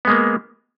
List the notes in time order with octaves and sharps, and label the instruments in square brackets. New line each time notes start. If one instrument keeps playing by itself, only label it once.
[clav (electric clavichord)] B3
G#3
A#3